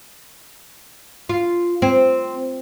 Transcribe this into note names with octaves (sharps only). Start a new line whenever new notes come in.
F4
C4